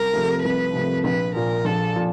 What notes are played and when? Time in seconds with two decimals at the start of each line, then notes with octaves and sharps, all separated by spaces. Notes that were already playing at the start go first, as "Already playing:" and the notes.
Already playing: C2 A#4
0.13 C3 F3 A3
0.43 C2 B4
0.74 C3 F3 A3
1.04 A#1 B4
1.35 A#2 F3 A#4
1.65 A#1 A4
1.96 A#2 F3